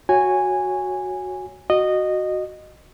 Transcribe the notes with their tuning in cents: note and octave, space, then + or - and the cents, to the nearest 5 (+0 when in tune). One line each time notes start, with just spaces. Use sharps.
F#4 -5 C#5 +0 G#5 -10
F#4 +0 D#5 -15